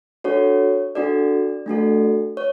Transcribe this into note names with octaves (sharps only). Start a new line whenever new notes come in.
D4 F#4 A4 C#5
D4 F#4 A4 D5
A3 D4 F#4 A4
C#5